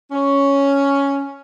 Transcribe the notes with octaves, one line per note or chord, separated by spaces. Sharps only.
C#4